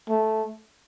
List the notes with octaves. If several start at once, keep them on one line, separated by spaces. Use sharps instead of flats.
A3